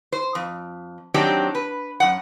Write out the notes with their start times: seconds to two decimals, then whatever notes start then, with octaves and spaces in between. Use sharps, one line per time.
0.12 C5
0.35 F2
1.14 D#3 F#3 C4 D4 D#4 G4
1.55 B4
2.00 F#2 F#5